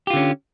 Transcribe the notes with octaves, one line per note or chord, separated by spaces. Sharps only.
D3 C#4 F4 G4